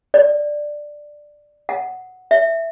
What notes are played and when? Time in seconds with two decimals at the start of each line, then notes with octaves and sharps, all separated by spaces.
0.14 D5
1.69 F#5
2.31 E5